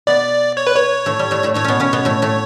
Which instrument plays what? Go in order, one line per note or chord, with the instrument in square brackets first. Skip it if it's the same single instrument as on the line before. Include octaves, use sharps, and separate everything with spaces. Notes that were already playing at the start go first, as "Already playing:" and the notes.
[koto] B2 B3 [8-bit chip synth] D5
[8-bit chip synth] C#5
B4
C#5
[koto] A2 A3
G3
A2 A3
A2 A3
[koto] A2 A3 [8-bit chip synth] C#5
[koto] B2 B3 C#4
C#3 C#4
B2 B3
A2 A3
A2 A3